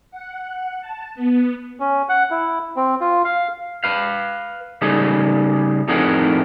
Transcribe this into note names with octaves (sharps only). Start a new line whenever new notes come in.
F#5
A5
B3
C#4
F#5
E4
C4
F4
F5
B4 F5
C#3 G3 D#4 G#4 A4
F2 A2 D#4 G#4 A#4 F#5